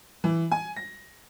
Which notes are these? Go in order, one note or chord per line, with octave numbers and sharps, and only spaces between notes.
E3
G#5
A#6